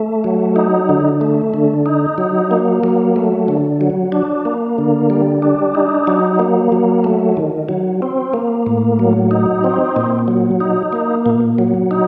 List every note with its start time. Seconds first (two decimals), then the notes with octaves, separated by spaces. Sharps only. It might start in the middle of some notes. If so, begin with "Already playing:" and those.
Already playing: A3
0.24 F#3
0.56 D#4
0.89 D3
1.21 A3
1.54 D3
1.86 D#4
2.18 F#3
2.51 A#3
2.84 F#3
3.16 A3
3.48 D3
3.81 F#3
4.12 D4
4.45 A#3
4.78 D3
5.10 G3
5.42 D4
5.75 D#4
6.07 F#3
6.39 A#3
6.72 F#3
7.04 A3
7.37 D#3
7.69 F#3
8.02 C4
8.34 A#3
8.67 A2
8.99 F#3
9.31 D#4
9.64 C4
9.96 A#2
10.28 F#3
10.60 D#4
10.93 A#3
11.26 A#2
11.58 F#3
11.91 D#4